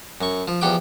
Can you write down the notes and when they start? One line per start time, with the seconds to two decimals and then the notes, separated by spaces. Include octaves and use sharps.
0.21 F#2 C#6
0.48 F3
0.61 E2 F3 G4 F#5 G5 D6